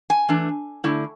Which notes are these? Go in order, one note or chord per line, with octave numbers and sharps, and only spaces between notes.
G#5
E3 A3 D4
D3 A3 E4